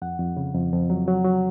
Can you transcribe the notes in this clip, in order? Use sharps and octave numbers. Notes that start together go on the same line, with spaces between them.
F2 F#5
F2
C#3
F2
F2
F#3
F#3
F#3